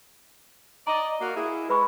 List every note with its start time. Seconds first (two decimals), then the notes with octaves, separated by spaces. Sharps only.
0.87 D5 D#5 A#5
1.21 A#3 F#4
1.35 E4 G#4
1.70 G#3 B4 B5 C#6